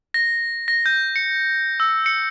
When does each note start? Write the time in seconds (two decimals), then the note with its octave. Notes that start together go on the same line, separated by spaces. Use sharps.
0.14 A#6
0.68 A#6
0.86 G6
1.16 C#7
1.80 E6
2.06 C#7